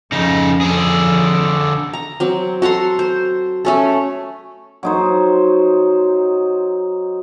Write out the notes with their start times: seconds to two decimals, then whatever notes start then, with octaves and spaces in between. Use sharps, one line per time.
0.12 F2 C#3 D#4
0.61 D3 G#4
1.93 A#5
2.20 F#3 C4
2.62 F#4 A4 A#5 C6
2.99 C5
3.65 A3 C#4 A4
4.83 F#3 D#4 C5